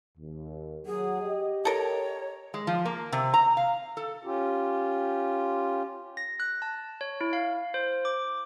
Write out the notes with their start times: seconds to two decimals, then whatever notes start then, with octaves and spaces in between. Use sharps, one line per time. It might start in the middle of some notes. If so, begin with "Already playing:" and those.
0.18 D#2
0.86 F#3 G#4 F#5
1.21 G4 D#5
1.65 A4 A#4 C#5
2.54 G#3
2.67 F3
2.85 A#3
3.12 C3
3.34 A#5
3.57 F5
3.97 A4
4.24 C#4 F4 G4
6.17 A#6
6.40 F#6
6.62 A5
7.01 C#5
7.21 E4
7.33 F5
7.74 C5
8.05 D6